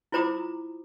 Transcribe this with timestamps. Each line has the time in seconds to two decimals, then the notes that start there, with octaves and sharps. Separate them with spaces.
0.12 E4 F4 C5 A#5 D6 D#6